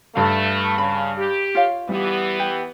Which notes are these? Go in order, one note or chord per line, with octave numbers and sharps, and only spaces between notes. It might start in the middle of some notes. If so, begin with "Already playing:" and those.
G2 A3 F5
C#3 B5
G4
F4 C#5 F5
E3 G3 B3
G4